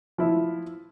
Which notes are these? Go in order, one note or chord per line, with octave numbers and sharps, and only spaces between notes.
F3 E4